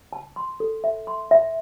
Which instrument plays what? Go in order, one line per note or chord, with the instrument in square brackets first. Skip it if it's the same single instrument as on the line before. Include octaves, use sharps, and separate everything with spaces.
[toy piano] A5
C6
A4
E5
C6
E5